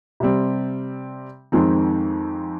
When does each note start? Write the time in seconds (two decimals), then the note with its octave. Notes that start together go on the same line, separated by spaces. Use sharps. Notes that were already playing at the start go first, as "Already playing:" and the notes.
0.20 C3 G3 C4
1.52 F2 D#3 G#3 C4 D#4